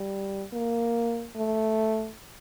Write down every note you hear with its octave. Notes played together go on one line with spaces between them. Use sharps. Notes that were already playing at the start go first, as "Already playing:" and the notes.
Already playing: G3
A#3
A3